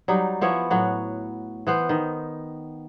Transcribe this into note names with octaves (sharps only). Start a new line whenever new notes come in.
F#3 G3 D#4
F3 B3 E4 C#5
A2 F#3 F#4
E3 B3 C5
D#3